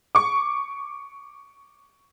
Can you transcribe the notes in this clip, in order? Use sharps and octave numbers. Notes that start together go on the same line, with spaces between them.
C#6 D6